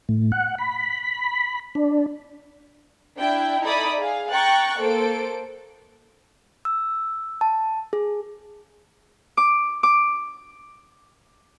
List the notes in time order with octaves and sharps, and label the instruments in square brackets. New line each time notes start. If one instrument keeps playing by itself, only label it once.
[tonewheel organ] A2
F#5
B5
D4
[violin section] D4 E4 G5
D#4 E4 A4 D5 B5 D#6
G#4 F5
G5 A#5 C#6 F#6 A6
A#3 A4 C5 D7
[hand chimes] E6
A5
G#4
[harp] D6
D6